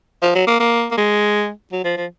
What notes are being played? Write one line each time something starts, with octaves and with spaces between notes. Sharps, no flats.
F3
F#3
A#3
A#3
A#3
G#3
F#3
F3
F3